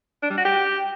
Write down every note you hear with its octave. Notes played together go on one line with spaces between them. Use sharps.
D4
G3
F#4
G4